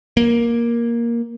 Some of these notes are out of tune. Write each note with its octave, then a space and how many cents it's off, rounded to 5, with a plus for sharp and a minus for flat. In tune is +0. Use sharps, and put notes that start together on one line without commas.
A#3 +10